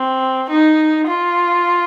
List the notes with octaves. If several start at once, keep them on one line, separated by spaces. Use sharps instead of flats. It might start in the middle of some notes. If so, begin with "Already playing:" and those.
Already playing: C4
D#4
F4